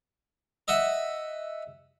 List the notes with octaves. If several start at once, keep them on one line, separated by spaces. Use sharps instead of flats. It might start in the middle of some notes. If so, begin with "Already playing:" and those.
D#5 E5 F#5